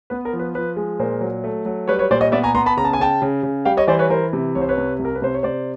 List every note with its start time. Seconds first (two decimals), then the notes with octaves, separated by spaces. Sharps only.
0.10 B3 B4
0.25 A#4
0.33 F3
0.39 B4
0.55 F3 B4
0.76 G#3
0.99 A#2 A#4 C5
1.21 F#3
1.44 A3
1.65 F#3
1.88 G3 B4 C#5
1.99 B4 C#5
2.11 A#2 C5 D5
2.21 C#5 D#5
2.32 B3 D5 E5
2.43 G#5 A#5
2.54 B3 A#5 C6
2.66 A5 B5
2.77 C#3 A#5
2.85 A5
2.93 G#5
2.99 C#3 G5 A5
3.22 C#3
3.43 C#3
3.65 G3 F5 G5
3.77 C#5 D#5
3.87 E3 C5 D5
3.99 B4 C#5
4.10 E3 A#4 C5
4.33 C3
4.55 C2 C#5
4.61 C5
4.69 B4 C#5
4.78 C3
4.99 C2
5.05 A#4
5.15 B4
5.22 C3 C5
5.34 C#5
5.43 C3 C5 D5